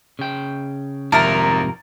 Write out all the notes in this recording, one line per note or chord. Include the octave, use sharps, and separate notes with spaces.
C#3 G5
G#1 F2 G#2 C3 A#4 E5 A6